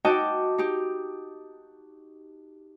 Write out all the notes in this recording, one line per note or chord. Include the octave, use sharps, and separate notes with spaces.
D#4 F#4 D#5 G5 A5 D6
D#4 G4